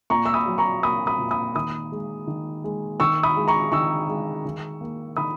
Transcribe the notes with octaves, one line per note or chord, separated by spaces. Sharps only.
A#2 A#5 C#6
E6
B5 D#6
F#3
A#5 C#6
A#3 B5 D#6
B5 D#6
A#2
B5 D#6
D#3 B5 D#6
G#3
D#3
G#3
D#3 C#6 E6
B5 D#6
G#3
A#5 C#6
D#3 C#6 E6
G#3
D#3
A#3
D#3 B5 D#6